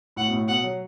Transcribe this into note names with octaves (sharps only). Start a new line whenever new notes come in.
A2 F#5
B2
A2
B2 F#5
F#3